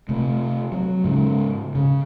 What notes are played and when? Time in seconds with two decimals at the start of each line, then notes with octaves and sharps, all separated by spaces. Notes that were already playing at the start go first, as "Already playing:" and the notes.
0.09 C3 A3
0.72 F#3
1.04 G#2 C#3 G#3
1.75 C#3